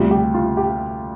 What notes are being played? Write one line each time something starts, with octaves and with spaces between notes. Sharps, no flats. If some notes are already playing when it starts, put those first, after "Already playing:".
Already playing: D2 C3 G3 F4
G4
F4
G4